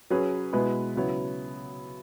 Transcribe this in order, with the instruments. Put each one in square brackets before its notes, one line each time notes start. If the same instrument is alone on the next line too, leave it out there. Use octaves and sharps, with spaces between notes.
[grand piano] F#3 C#4 G#4 B4
B2 G#3 B3 E4 B4
C#3 F#3 B3 E4 C#5